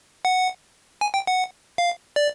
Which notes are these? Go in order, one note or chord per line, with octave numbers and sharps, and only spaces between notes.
F#5
G#5
G5
F#5
F5
D5